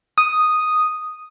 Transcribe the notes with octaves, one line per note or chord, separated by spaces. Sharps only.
D#6